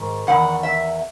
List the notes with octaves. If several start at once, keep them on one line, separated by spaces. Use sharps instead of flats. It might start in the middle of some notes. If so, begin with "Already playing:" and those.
Already playing: G#2 D#3
E2 D#3 F#5
E5